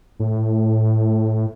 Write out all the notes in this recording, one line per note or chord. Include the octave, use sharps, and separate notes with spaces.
A2